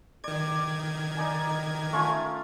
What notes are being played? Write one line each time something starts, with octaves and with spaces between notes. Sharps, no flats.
D#3 D5 G#6
D#4 D5 G#5
A3 C#4 F4